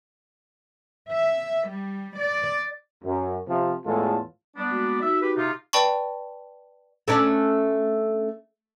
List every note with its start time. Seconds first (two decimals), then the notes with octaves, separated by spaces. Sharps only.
1.10 E5
1.68 G3
2.17 D5
3.03 F#2
3.47 C3 F3
3.85 E2 A2 G#3 F4 A4
4.57 G3 B3 D4
4.71 G#3 A#3 F#4
5.01 D#4 F#4 A#4 E5
5.21 G4 B4
5.36 C3 D#4 F4
5.73 B4 D5 G5 A5 B5 C#6
7.08 A3 C#4 D4